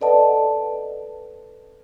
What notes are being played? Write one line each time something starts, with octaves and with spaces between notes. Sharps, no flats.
A4 B4 D5 D#5 F#5 A5